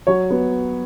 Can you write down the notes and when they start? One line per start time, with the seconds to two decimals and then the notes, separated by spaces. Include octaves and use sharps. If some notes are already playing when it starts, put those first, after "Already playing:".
0.07 F#3 C#5
0.30 B3